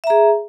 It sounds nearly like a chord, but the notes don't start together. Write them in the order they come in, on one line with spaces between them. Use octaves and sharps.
E5 A#5 G#4